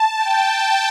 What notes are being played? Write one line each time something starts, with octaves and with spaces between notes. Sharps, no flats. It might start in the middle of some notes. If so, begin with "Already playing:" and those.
Already playing: A5
G5